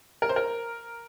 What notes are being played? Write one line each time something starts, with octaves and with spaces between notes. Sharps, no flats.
A#4
C5
A#4